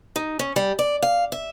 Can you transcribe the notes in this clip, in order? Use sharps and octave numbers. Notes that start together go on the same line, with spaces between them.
D#4
C#4
G3
D5
F5
E5